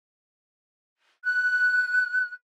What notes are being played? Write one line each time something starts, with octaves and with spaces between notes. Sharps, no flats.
F#6